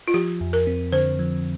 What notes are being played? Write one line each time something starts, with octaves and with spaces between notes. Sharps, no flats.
F4
F3 G4
F2
A#4
C4
D3 C5
F3